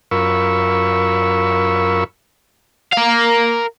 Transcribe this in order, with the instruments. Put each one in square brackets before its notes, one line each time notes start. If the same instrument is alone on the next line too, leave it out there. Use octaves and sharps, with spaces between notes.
[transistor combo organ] F#2 F4 A#4 B5 C#6 E6
[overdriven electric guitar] A#4 F5